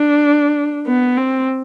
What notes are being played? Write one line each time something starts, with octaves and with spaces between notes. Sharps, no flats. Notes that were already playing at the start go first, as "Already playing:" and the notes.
Already playing: D4
B3
C4